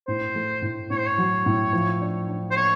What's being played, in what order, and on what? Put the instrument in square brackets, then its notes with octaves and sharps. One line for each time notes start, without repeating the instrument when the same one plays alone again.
[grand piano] A2 [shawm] C5
[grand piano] A3
A2
[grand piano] A2 [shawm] C#5
[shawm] C5
C#5
[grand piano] F#3
A2
F3
D4
D4
[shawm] C5
[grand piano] A#3 [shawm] C#5